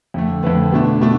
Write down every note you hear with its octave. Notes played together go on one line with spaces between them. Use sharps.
F2 D3 A3
F2 D3 A3 B4
B2 A3 D4
B2 A3 D4